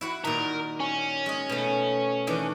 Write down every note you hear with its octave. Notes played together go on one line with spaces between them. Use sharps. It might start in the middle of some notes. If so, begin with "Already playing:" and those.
E4 F#4 F#5
A#2 D#3 A#4
C#4
G#3 D#5
B2 A3
D#3 E3 D4